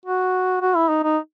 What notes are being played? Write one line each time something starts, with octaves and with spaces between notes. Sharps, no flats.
F#4
F#4
E4
D#4
D#4